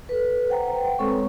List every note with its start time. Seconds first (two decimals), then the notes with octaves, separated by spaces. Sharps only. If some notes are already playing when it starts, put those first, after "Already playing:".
0.09 A4 B4
0.49 C5 F#5 G5 A#5
0.72 B4
0.99 G#3 C4 A4 B4 C#5 C#6